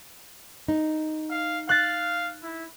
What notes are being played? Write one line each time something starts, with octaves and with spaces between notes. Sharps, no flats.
D#4
F5
F5 F#6 A6
E4